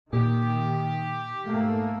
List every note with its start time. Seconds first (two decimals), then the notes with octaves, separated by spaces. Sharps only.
0.13 A#2 D#3 G4
1.46 G#2 A3 A#3